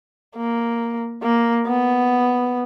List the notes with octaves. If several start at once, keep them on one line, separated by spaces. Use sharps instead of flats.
A#3
A#3
B3